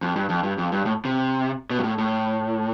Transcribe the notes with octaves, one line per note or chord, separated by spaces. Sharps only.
F2
G2
F2
G2
F2
G2
A2
C3
B2
G2
A2
A2